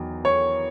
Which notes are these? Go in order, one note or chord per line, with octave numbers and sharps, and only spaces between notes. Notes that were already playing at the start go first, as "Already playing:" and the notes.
Already playing: E2 D#3 F#3
C#5